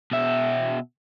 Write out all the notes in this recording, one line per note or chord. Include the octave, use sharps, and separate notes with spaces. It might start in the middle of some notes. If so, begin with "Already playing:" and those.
B2 E5